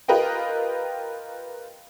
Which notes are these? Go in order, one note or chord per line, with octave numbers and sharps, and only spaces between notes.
F4 G4 A#4 B4 D#5 G5